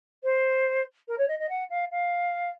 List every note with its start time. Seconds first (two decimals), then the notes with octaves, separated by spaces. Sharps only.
0.23 C5
1.07 A#4
1.17 C#5
1.28 D#5
1.39 D#5
1.49 F#5
1.69 F5
1.91 F5